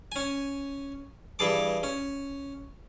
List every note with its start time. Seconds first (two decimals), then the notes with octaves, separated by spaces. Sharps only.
0.12 C#4 G#5
1.39 G2 E3 G#4 A5 D6
1.83 C#4